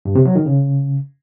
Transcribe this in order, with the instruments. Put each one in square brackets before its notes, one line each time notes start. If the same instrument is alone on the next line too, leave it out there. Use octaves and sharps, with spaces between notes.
[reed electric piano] G2
C3
F#3
D#3
C#3